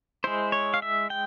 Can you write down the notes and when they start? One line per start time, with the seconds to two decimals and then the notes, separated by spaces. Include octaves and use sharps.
0.24 G#3 E4 C5
0.52 C#5
0.74 F5
0.82 E5
1.10 G5